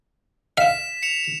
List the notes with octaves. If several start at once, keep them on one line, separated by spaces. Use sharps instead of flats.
F5 B6 E7
C#7 E7 F7